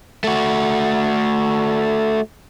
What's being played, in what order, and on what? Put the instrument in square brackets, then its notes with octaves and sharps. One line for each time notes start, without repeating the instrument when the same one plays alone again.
[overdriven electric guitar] A3 F#4